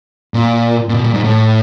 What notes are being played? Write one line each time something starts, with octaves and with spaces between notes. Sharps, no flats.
A#2
A#2
B2
A#2
G#2
A2